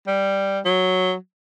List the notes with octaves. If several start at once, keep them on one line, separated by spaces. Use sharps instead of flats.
G3
F#3